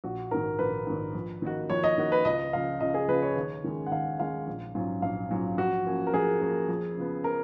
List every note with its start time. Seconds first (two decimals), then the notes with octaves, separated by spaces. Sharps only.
0.04 A#1 F#4
0.31 G#2 D#3 A#4
0.59 A#1 B4
0.87 G#2 D#3
1.15 F2
1.42 D#3 A#3 D#4 F#4
1.70 F2 C#5
1.84 D#5
1.98 D#3 A#3 D#4 F#4
2.12 B4
2.25 C#2 D#5
2.53 C#3 F3 F5
2.81 C#2 D#5
2.94 G#4
3.08 C#3 F3 B4
3.22 C#5
3.36 D#2
3.64 D#3 G#3 C#4
3.86 F#5
3.92 D#2 F5
4.19 D#3 G#3 C#4 F5
4.47 A#1
4.75 G#2 F#3 C#4 F4
5.02 A#1 F5
5.30 G#2 F#3 C#4 F4
5.58 F2 F#4
5.86 F3 A#3 C#4
6.07 A#4
6.13 F2 G#4
6.41 F3 A#3 C#4
6.69 F2
6.97 C#3 F3 B3
7.24 A#4